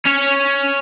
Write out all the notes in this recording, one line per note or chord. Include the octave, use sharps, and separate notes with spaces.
C#4 C#5